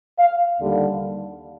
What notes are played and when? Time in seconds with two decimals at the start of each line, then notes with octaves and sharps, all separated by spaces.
0.19 F5
0.57 D#2 D3 G3